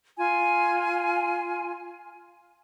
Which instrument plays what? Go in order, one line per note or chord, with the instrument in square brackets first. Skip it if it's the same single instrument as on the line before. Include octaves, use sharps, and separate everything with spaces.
[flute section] F4 G#5